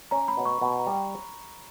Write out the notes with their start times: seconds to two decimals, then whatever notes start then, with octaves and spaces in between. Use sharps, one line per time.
0.11 C#4 A#5
0.28 B5
0.37 B2
0.45 C#6
0.61 B2 B5
0.79 A#5
0.87 G3